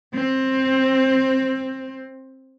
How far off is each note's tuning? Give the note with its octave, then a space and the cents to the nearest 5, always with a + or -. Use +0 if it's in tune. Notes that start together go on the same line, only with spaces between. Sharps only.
C4 +15